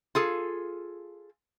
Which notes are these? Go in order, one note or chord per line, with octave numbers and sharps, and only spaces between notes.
F4 G#4 A4